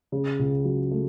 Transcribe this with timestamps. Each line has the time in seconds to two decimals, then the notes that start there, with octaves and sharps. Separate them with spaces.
0.12 C#3
0.39 C#2
0.65 F#3
0.91 A3